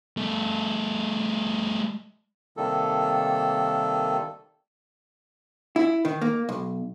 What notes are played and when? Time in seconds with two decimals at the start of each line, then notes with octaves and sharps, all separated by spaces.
0.17 G3 A3
2.57 C3 D#3 G3 A#3 A4
5.76 E4
6.05 D#3
6.21 A#3
6.49 B1